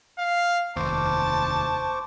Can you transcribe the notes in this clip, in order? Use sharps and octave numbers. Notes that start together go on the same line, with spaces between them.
F5
F1 D#2 C5 A5 C#6 D6